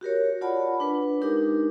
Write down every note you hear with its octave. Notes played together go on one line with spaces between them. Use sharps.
F#4 G4 A#4 C#5
F4 C#5 D5 F#5 A5 B5
D4 B4
G#3 D4 D#4 G4 A#4 D6